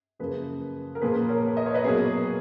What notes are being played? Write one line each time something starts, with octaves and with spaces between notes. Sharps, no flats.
F#2 C#3 F3 A#3 G#4 B4
A#4
A#2 F3 A#3 G#4 B4
A#4 C#5
D#5
C#5
B4 D#5
B2 F#3 A#3 G#4